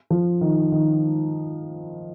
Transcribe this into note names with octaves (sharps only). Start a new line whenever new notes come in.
F3
D#3
D#3